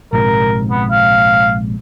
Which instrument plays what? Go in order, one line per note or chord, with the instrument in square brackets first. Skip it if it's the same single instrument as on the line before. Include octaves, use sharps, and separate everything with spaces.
[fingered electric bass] A#1 G#2 C3 [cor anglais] A#4
[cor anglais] B3
F5